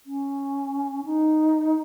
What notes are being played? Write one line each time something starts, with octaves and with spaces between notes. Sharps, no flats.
C#4
D#4